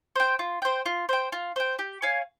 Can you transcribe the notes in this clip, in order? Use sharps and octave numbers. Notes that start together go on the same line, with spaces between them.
C5 G5
F4
C5 G5
F4
C5 G5
F4
C5 G5
G4
C#5 F5 G#5